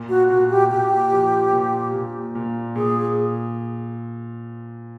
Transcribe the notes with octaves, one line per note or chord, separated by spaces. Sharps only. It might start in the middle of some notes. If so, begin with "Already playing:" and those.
Already playing: A#2
F#4
A#2 F#4
G4
A#2 G4
F3
A#2
A#2
A#2
A#2 G#4